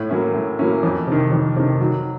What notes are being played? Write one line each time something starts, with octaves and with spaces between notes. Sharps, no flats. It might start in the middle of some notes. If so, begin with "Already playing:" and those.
Already playing: A2
F#3 A#3 C#4 E4
A2
F#3 A#3 C#4 E4
F2
C3 D#3
F2
C3 D#3
F#3